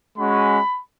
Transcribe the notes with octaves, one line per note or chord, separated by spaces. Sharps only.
G#3 C#4 F#4 B5